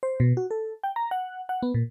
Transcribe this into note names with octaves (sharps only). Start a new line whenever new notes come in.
C5
B2
F#4
A4
G5
A#5
F#5
F#5
B3
A#2